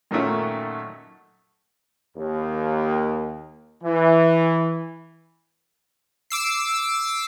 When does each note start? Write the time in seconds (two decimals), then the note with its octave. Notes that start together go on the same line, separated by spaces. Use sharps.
0.11 F#2 A#2 D#3 F#3 A3 C#4
2.16 D#2
3.83 E3
6.30 D6 E6 C7